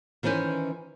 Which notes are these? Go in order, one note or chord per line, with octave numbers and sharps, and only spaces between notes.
D#3 E3 C#4 B4 C5